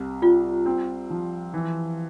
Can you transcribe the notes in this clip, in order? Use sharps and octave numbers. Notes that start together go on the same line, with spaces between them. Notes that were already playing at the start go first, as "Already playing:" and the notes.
Already playing: C2
G3 F4
C4
F3
E3